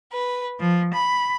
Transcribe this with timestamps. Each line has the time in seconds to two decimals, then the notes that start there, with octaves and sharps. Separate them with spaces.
0.13 B4
0.60 F3
0.94 B5